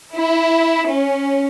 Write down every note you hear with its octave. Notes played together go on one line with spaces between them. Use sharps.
E4
C#4